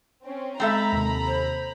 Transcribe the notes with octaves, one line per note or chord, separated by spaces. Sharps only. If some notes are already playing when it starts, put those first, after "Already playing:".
C4 C#4
G#3 C4 A4 E5 A#5 B5
D#2 C3
C5